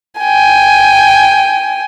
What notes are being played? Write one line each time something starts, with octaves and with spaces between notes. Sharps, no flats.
G5 G#5